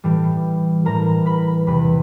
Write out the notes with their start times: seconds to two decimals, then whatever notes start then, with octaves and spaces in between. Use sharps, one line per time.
0.04 A2 E3 G3
0.85 A2 E3 G3 A#4 A#5
1.26 B4 B5
1.66 E2 C3 E3 G3 B4 B5